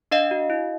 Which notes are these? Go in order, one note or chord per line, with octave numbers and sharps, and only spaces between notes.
D4 D#5 F5
F#4
E4